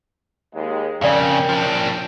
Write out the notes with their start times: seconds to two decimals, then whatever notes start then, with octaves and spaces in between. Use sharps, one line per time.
0.53 D#2 G#3
1.01 F2 C#3 C#4 A#4 D5 F5 G5
1.49 F3 D4